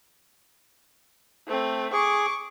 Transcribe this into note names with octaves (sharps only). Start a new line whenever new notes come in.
A3 C4
G#4 C#6 D6